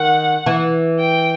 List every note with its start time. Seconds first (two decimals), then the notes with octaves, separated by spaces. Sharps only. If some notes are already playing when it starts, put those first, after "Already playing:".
Already playing: D#3 F#5
0.46 E3
1.00 G5